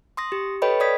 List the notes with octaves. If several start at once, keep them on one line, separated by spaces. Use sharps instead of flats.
C6 D#6 A#6
G4
A4 B4 C#5 D#5 G5 B5
C#5 D5 D#6 G#6 B6